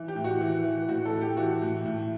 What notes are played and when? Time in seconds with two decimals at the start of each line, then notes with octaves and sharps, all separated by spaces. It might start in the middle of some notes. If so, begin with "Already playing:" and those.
Already playing: E3
0.08 G4
0.16 A2
0.24 F#4
0.40 E3
0.64 E3
0.88 A2 F#4
1.05 A4
1.13 A2
1.21 G4
1.37 E3 F#4
1.62 A2
1.86 A2